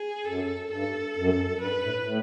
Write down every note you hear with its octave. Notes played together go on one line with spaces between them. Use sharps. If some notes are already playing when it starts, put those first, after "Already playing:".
Already playing: G#4
F#2 A4
G2 A4
F#2
G2 B4
A2
A2